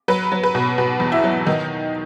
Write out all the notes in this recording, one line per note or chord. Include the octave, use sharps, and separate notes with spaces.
F#3 B4
F#3
B4
B2
B2
E2
E4
F#3
D#3 D#4